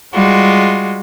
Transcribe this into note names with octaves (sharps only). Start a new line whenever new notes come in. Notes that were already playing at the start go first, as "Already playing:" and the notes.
G3 G#3 F4 F#4